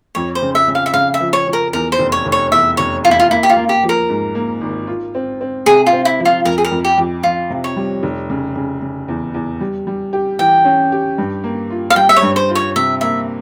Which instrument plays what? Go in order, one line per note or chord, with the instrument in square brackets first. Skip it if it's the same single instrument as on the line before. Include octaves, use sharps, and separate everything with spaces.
[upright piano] F2 [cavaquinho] C#5
[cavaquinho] C5
[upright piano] C#3
[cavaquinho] E5
[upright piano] C#3
[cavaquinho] F5
E5
[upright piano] C#3 [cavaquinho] F5
[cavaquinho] E5
[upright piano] F3
[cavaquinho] C#5
[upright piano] F3
[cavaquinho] A#4
[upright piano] E2 [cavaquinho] A#4
[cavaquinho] C5
[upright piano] F1
[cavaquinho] C#5
[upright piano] F1
[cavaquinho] C#5
[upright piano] E2 [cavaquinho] E5
[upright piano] F1 [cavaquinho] C#5
[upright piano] E2 [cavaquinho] F4
[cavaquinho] E4
F4
[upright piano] A#3 [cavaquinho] E4
[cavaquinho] G4
F4
[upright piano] A#3
[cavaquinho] G4
[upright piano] F3
[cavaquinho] A#4
[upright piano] G#2
A#3
G#1
F4
C4
C4
[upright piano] C3 [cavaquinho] G#4
[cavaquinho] F4
[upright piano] C4
[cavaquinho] E4
[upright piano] F3
[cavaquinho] F4
[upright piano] F2 [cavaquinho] A#4
[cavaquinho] G#4
A#4
[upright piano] F2
[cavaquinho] G4
[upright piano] F2
[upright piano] F2 [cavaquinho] F4
[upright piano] C3
[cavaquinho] C#5
[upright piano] G3
F1
C#3
C#3
C#3
E2
E2
G3
G3
G4
[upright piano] E3 [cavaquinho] G5
[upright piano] C#4
G4
G2
A#3
F4
[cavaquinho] F5
[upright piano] G3 [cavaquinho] G5
[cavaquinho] E5
C#5
[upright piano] G2
[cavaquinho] C5
[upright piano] F4
[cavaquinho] C#5
[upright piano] C3 [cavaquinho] E5
[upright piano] A#3 [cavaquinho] E5